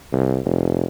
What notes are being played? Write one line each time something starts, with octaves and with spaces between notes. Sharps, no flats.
C2
F1